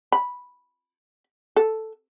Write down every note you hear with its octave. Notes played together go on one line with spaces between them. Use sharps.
B5
A4